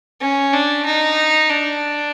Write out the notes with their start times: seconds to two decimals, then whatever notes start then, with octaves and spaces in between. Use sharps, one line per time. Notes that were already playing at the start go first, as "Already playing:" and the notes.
0.21 C#4
0.53 D4
0.86 D#4
1.50 D4